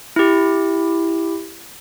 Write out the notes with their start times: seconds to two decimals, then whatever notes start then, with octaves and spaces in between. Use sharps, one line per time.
0.16 E4 G4